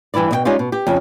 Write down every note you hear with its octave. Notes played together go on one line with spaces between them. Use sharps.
G2 E3 E4 B4 D5
B2 D#5 G5
G3 G#3 C#4 D#4 F4 G4
B2
G4
F2 C#3